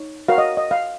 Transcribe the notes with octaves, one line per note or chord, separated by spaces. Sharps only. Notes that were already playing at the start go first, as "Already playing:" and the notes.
Already playing: D#4 C#5
F#4 A#4 C#5 F5
D#5
D#5
F5